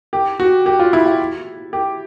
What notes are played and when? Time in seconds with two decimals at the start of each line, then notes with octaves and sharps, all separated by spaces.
0.13 G4
0.40 F#4
0.66 G4
0.79 F4
0.93 E4
1.06 F4
1.73 G4